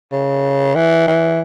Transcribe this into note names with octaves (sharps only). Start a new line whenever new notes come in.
C#3
E3
E3